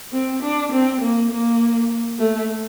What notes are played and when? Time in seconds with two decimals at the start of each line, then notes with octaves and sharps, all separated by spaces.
0.12 C4
0.42 D4
0.72 C4
1.01 A#3
1.31 A#3
2.19 A3